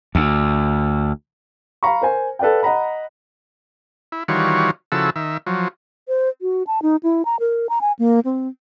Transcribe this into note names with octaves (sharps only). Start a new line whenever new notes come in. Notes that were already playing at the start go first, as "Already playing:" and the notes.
D2
F5 A#5 B5 C#6
A#4 C5 G#5
A4 B4 D5 F5 G5
D#5 F#5 A#5 B5
E4
D#3 E3 G3 F4 F#4 C#5
C#3 F3 E4 F#4 A4 E6
D#3 E5
F3 F#3
C5
F#4
A5
D#4
E4
A#5
A#4
A#5
G#5
A#3
C4